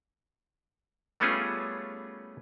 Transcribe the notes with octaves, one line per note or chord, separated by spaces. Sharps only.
G3 A3 B3 C#4 F4 G#4